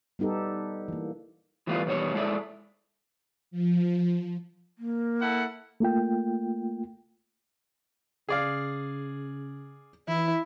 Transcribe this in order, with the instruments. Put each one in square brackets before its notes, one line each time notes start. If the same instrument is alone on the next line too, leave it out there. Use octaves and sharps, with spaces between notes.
[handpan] G3 B3 D#4 G4 A4
E3 A#3
[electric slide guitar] E3 G3 A3 B3 E4 F4
E2 B2 D#3 G3 C#5
G#3 E4 A4 D5 E5
[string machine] F3
[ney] A#3
[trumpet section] E4 A4 F#5
[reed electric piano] A3 A#3 F4 G5
[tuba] C#3 [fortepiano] G#4 D5 F5
[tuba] E3 [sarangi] E4